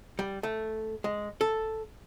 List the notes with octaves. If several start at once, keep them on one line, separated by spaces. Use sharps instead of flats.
G3
A3
G#3
A4